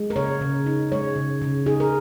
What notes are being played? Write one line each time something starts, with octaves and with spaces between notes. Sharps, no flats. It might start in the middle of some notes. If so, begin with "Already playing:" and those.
Already playing: G#3
A#4
C#3 C#5
C#3
D#4
G#3 C#5
C#3
C#3
D#4 G#4
A#4